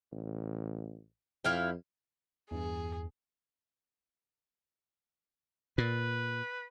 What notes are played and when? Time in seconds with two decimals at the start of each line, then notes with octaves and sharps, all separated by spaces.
0.12 A1
1.45 F2 E4 F5 G5
2.51 E2 G2 G#4
5.78 A#2 B4